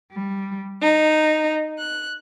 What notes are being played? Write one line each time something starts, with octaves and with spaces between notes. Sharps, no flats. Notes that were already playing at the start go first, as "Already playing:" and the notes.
G3
D#4
F#6